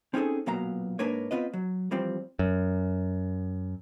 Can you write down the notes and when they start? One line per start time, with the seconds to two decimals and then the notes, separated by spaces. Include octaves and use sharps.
0.14 C4 C#4 D#4 G#4 A4
0.46 B1 A#2 F#3 B3 F5 A#5
0.99 G#2 A#3 D4 A#4 B4 C#5
1.31 B3 C4 F4 B4 D#5
1.53 F#3
1.91 E3 F3 G3 C4
2.39 F#2